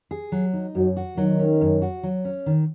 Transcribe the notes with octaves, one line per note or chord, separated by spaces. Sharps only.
G#4
F#3
D#4
F#2 F#3
F#4
D#3 F#3
C#4
F#2
F#4
F#3
C#4
D#3